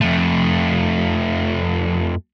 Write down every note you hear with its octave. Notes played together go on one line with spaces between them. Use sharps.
F2 A3